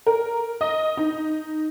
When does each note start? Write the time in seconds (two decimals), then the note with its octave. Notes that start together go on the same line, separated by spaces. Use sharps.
0.06 A#4
0.61 D#5
0.97 D#4